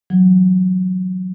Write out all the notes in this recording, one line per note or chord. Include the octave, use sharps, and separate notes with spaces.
E3 F#3